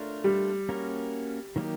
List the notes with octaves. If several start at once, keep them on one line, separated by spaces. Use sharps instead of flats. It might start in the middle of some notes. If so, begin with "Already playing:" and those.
Already playing: A3 D4 F4 A#4 C#5
G3
A#3 C#4 F#4 A#4 C#5
D#3 F#3 A#3 D#4 G4